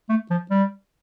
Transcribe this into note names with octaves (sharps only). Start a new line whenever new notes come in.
A3
F3
G3